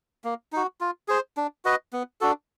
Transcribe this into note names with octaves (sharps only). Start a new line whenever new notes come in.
A#3
D#4 F#4
F4
G#4 C5
D4
F#4 B4 D#5
B3
D4 F#4 A4